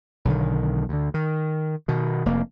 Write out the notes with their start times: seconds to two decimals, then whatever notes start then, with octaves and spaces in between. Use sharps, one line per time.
0.25 B1 D3 D#3
0.89 D2 D3
1.14 D#3
1.88 B2 D#3
2.26 F1 A#3